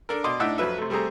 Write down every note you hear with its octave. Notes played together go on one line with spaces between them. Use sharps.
D4 A4 A#4
B2 D5 D#5 C6 D6
A2 D4 D#4 E5 F#5 E6
F2 F#3 B4 E5
C3 A3
G3 A3 C4 G#4 A#5